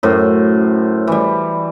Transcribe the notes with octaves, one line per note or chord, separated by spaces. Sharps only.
F#2 A2 C5
E3 G3